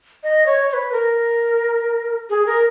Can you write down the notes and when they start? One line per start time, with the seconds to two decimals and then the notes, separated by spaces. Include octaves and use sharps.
0.23 D#5
0.46 C#5
0.69 C#5
0.73 B4
0.92 A#4
2.30 G#4
2.47 A#4